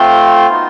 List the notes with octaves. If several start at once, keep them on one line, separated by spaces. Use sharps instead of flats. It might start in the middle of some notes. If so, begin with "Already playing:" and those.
Already playing: A3 C4 F4 C6
B3 D#4 F#4